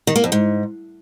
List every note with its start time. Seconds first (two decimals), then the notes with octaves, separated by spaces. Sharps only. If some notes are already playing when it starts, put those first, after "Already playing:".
0.07 D#3
0.15 A#3
0.24 F2
0.32 G#2